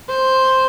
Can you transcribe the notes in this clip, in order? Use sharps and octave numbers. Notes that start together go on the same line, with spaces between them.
C5